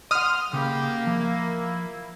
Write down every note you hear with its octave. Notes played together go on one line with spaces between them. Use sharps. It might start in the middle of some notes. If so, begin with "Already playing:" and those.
D#5 F#5 C6 D#6 F6
C#3 A#3 G4 F5 B5
F3 E4